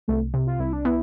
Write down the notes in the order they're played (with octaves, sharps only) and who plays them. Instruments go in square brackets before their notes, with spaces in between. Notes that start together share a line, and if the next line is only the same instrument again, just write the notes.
[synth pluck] C2 [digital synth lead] A3
[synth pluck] C3
[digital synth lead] F4
[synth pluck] C2 [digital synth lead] E4
[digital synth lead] D4
[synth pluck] B3 [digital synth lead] E4